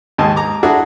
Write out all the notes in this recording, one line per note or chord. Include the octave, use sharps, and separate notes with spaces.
D#2 G#2 D#5 G#5 A5
A#5 D6
D4 E4 F#4 G#4 A4